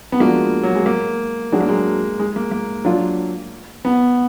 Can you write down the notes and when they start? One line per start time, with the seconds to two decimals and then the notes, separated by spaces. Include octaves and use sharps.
0.12 B3
0.20 F3 G#3 A#3 D4 F#4
0.63 F#3
0.75 G#3
0.86 A#3
1.52 F#3 G#3 D4 F#4
1.61 A#3
1.69 G#3
2.19 G#3
2.36 A#3
2.51 A#3
2.85 F#3 D4 F4
3.85 B3